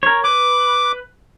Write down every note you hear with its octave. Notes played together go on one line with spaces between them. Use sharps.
A#4 C#5
B4 D6